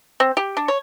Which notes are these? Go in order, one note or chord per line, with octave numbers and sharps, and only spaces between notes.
C4
G4
D4
C#5